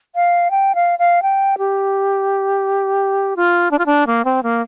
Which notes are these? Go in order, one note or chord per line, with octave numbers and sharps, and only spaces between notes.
F5
G5
F5
F5
G5
G4
F4
D4
F4
D4
A#3
C4
A#3